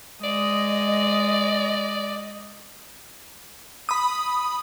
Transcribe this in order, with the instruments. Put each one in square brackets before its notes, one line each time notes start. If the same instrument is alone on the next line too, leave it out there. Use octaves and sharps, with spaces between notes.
[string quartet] G#3 [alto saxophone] D5 [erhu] D#5 [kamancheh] D#6
[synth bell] B5 D#6